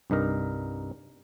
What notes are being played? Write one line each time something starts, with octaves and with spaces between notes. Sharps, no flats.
C2 G2 D#4 A#4